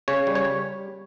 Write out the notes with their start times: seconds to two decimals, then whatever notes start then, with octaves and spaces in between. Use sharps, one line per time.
0.08 C#3 C#5
0.27 G3
0.35 C#5
0.45 G3